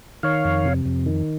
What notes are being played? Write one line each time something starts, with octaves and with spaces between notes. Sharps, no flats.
D#3 C#5 F5
F2
C3
F2
D#3